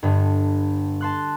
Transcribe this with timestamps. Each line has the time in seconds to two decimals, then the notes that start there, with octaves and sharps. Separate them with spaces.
0.03 G1 G2
1.01 A5 C6 F#6